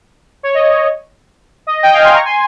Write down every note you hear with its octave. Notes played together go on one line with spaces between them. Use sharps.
C#5
D#5
D#5
D#5 G5
F5 G#5
G#5 C6
A#5 C#6
G#5 C6